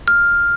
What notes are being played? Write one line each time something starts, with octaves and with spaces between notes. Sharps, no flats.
F6